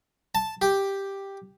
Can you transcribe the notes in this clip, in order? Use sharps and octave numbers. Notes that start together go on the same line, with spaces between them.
A5
G4